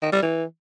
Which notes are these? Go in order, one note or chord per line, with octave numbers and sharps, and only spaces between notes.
D#3
G3
E3